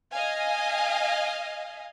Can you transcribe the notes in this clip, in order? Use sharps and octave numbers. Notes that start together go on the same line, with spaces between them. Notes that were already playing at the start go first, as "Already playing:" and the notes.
D#5 F5 G#5